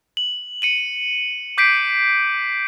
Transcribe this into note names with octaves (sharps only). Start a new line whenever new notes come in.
F#7
C#7 D#7 F#7
D6 G6 B6 C7 D7